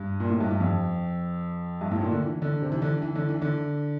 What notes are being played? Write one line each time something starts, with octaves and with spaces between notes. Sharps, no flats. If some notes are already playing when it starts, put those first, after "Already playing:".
Already playing: G2
A#2
A2
G2
G2
F2
G2
A2
A#2
D3
E3
D3
C3
E3
D3
E3
D3
E3
D3